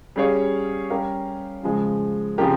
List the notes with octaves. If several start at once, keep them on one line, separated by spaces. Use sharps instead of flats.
G3 C#4 G#4 C#5 F5
G3 C#4 G4 A#4 F5
C#3 F3 G#3
C#3 F3 C4 G4 A#4